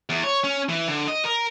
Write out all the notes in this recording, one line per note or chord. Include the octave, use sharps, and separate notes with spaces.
E2
C#5
C#4
E3
D3
D#5
A#4